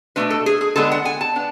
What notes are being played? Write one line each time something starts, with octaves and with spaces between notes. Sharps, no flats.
B2 A3 D4 B4
A4
G#4
G#4
D3 G#3 B3 D4 A4
F#5
G#5
A5
B3 D4